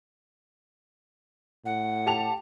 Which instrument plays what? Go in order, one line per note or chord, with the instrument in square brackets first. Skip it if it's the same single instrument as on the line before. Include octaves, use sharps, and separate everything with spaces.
[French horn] A2 [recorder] F#5
[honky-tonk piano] G4 A5 F7